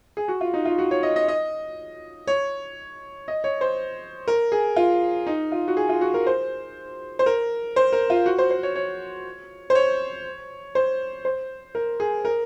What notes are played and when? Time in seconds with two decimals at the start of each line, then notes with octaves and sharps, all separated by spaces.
0.17 G#4
0.28 F#4
0.41 F4
0.54 D#4
0.65 F4
0.79 F#4
0.91 C#5
1.03 D#5
1.16 D#5
1.28 D#5
2.27 C#5
3.28 D#5
3.44 C#5
3.61 C5
4.28 A#4
4.52 G#4
4.76 F4
5.27 D#4
5.52 F4
5.68 F#4
5.77 G#4
5.89 F4
6.01 F#4
6.14 A#4
6.27 C5
7.19 C5
7.26 A#4
7.76 C5
7.93 A#4
8.10 F4
8.26 F#4
8.38 C5
8.51 C5
8.63 C#5
8.76 C#5
9.70 C5
9.75 C#5
10.75 C5
11.25 C5
11.75 A#4
12.00 G#4
12.25 A#4